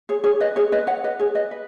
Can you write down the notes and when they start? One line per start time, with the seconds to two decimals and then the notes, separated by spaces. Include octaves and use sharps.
0.09 G#4 C#5
0.24 G#4 C#5
0.40 B4 D#5
0.56 G#4 C#5
0.72 B4 D#5
0.87 C#5 F#5
1.04 B4 D#5
1.19 G#4 C#5
1.35 B4 D#5
1.51 B4